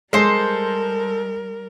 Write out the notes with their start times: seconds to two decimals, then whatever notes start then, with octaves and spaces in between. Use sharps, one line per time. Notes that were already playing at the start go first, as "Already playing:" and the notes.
0.13 G3 G#3 A4 A#4 C5